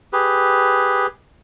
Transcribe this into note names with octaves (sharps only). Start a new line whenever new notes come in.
G4 G#4 B4